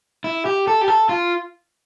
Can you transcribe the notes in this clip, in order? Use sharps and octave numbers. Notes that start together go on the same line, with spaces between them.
E4
G4
A4
G4
A4
F4